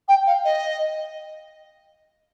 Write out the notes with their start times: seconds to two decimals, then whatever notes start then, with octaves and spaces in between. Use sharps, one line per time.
0.08 G5
0.26 F5
0.44 D#5